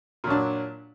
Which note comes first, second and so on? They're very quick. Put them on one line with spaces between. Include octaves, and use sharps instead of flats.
A#2 F#3 D4